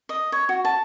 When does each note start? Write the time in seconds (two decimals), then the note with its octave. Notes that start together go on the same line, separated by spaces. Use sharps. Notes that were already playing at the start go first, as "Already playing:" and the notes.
0.09 D#5
0.32 C#5
0.49 F#4
0.65 A5